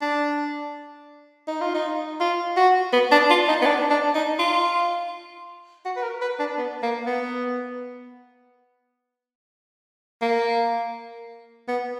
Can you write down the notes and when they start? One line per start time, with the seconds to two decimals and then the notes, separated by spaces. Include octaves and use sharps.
0.01 D4
1.48 D#4
1.61 F4
1.74 D#4
2.20 F4
2.56 F#4
2.93 B3
3.11 D4
3.30 F4
3.48 D#4
3.62 B3
3.66 D4
3.90 D4
4.15 D#4
4.39 F4
5.85 F#4
5.96 B4
6.02 A#4
6.21 B4
6.39 D4
6.58 B3
6.82 A#3
7.06 B3
10.22 A#3
11.68 B3